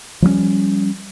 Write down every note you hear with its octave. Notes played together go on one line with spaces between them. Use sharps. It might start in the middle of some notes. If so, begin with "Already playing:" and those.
F3 G3 A3 C#4